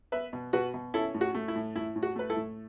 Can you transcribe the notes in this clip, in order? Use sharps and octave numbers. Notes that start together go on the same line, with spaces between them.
B3 B4 E5
B2
B2 F#4 B4
B2
C#4 E4 A4
A2
F#4
A3
E4
A2
A2 E4
A2
F#4
A3 B4
E4 A4
A2